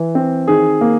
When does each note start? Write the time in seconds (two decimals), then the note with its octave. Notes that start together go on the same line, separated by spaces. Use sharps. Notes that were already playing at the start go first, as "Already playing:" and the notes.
Already playing: E3
0.15 C4
0.48 D#3 G#4
0.81 A#3